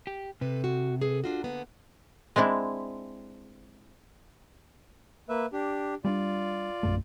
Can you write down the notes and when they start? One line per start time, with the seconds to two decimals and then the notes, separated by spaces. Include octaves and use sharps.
0.07 G4
0.41 C3 A4 B4
0.64 F#4
1.01 G#4 A4 B4
1.24 D4 F4 F#4
1.44 D3 A#3 B3
2.36 G#3 C4 D4 E4
5.29 A#3 B4 E5
5.53 D4 G4
6.05 G3 A#3 D4 F4 D5
6.83 A#1 F#2 A3